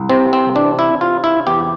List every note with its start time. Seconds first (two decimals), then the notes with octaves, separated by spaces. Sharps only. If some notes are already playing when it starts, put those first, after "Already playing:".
Already playing: C2
0.09 C3 C4
0.33 C4
0.55 E3 D4
0.79 E4
1.01 C3 F4
1.24 E4
1.47 E2 G4